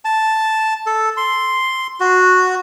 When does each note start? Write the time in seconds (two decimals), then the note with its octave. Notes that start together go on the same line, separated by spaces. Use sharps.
0.05 A5
0.86 A4
1.17 C6
2.00 F#4